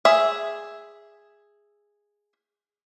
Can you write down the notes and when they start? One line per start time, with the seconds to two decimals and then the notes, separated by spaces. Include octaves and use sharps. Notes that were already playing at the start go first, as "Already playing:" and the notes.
0.05 G#4 E5